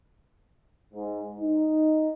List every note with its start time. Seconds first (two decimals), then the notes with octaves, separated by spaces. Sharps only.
0.94 G#2
1.40 D#4